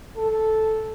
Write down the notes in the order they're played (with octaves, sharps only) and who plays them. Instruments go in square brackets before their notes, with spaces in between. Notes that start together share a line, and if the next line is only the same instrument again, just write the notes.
[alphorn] A4